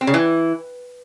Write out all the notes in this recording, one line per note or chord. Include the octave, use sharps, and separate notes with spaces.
C4
C#3
E3